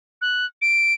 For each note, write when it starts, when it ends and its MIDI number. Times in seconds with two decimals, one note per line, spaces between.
0.22 0.46 90
0.62 0.94 98